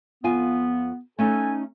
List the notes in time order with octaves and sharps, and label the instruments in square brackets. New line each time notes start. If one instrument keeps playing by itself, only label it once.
[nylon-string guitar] F2 F4 G#5 [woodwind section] B3
[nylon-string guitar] A3 C#4 D#4 [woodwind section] A4 G#5